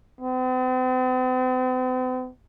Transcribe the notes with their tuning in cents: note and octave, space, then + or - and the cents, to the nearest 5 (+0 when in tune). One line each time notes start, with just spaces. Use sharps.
C4 -45